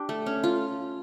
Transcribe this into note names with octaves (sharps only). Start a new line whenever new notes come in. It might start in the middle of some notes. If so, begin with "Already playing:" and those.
Already playing: D4 G4
A3
C#4
F4